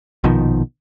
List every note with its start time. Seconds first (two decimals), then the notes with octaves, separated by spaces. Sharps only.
0.24 A#1 B2 D#3 F3